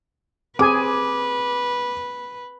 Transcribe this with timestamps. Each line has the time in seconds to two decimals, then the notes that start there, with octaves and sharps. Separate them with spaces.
0.59 C4 G#4 B4 G#5 D6